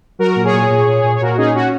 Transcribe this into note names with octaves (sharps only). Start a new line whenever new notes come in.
F#3 F#4 A#4
A#2
G#4 C#5
A#2
A#2
A#2
A#2
C#5
A#2 F#4 A#4
C#4 D#4 G#4
C#4 F#4